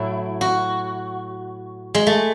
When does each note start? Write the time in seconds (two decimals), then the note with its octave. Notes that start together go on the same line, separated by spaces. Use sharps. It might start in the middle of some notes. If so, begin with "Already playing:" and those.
Already playing: A2 F#3 E4
0.41 F#4
1.95 G#3
2.07 A3